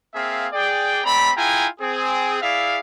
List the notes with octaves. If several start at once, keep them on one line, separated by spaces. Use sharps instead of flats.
A#3 C4 G#4 E5 F5
G#4 D5 G5
A3 C4 D5 A#5 B5
E4 F4 G#4 G5 G#5 A#5
C4 G#4
E4 G#4 D5 E5 F5